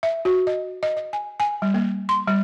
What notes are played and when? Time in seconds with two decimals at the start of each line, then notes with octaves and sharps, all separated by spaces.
0.03 E5
0.25 F#4
0.47 D#5
0.83 D#5
0.97 D#5
1.13 G#5
1.40 G#5
1.62 G3
1.74 A#3
2.09 C6
2.28 G3